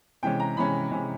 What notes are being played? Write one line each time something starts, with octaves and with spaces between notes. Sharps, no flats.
C3 E3 G#3 C#4 G5
A#5
C3 E3 G#3 C#4 B5
C3 E3 G#3 C#4